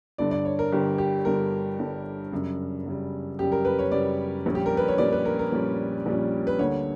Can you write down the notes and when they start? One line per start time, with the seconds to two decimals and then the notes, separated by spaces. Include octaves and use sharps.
0.18 G1 G2 D3 D5
0.31 D5
0.45 C#5
0.59 A#4
0.72 G1 G2 D3 G4
0.98 G4
1.25 G1 G2 D3 A#4
1.79 G1 G2 D3
2.32 F#2 C#3 G3
2.86 F#2 C#3 G3
3.39 F#2 C#3 G3 G4
3.52 A#4
3.65 B4
3.79 C#5
3.91 F#2 C#3 G3 D5
4.46 A#1 A#2 G3 C#4
4.55 G4
4.66 A#4
4.77 B4
4.88 C#5
4.98 A#1 A#2 G3 C#4 D5
5.12 B4
5.25 A#4
5.39 A#4
5.52 A#1 A#2 G3 C#4
6.06 A#1 A#2 G3 C#4
6.47 B4
6.59 D2 D3 G3 A#3 C#5